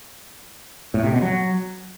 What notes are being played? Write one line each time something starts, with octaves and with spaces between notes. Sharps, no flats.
A2
C3
B2
F#3